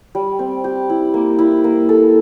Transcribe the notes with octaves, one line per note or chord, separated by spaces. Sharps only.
G3
C4
G4
E4
A#3
E4
A#3
A4